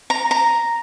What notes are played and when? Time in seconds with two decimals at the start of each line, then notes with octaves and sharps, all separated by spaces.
0.10 A#5
0.31 A#5